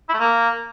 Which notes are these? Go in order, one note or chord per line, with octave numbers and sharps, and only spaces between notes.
E4
A3
A#3